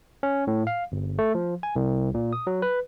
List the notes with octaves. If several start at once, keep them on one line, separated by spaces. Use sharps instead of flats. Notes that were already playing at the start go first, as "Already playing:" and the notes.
C#4
A2
F5
G1
A3
F3
G#5
C2
A#2
D#6
F#3
B4